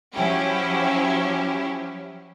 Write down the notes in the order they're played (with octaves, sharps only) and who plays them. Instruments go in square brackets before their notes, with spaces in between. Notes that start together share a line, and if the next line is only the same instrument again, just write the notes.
[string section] F3 F#3 C#4 E4 G4